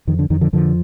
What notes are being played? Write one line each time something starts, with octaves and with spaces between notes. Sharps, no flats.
F2 D#3
D3
F2 D#3
D3 F3
F2 D3 F3